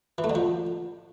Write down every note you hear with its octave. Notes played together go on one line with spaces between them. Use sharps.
E3
A3
D3
F3